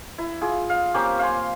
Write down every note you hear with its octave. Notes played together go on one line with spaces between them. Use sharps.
E4
F4 G#4 D6
F5
A#3 C4 C#4 G4
F5 G#5 C6